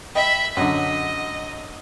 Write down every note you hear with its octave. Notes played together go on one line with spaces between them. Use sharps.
D#5 E5 G5 B5
F#2 D3 D#5